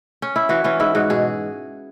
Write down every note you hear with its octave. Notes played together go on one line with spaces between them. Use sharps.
C#4
E4
E3 F#4
E3 C#4
G#2 E4
G#2 F#4
B2 G#4